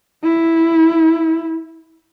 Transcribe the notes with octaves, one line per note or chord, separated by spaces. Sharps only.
E4